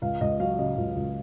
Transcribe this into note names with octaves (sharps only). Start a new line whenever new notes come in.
C#2 F5
C#2 D#5
F#3 F5
C#3 D#5
C#2
C#2